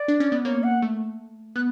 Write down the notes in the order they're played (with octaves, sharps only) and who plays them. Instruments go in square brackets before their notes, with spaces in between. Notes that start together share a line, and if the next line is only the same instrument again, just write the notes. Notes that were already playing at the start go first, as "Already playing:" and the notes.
Already playing: [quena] D5
[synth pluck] D4
C#4
B3
[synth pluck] A#3 [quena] C#5
[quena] F#5
[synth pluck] A3
[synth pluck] B3 [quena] F#6